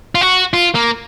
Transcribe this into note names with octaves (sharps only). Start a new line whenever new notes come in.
F4
F#4
F4
A#3